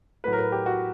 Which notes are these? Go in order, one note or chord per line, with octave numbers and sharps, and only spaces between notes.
A2 F#3 B4
A#4
B4
G4
F#4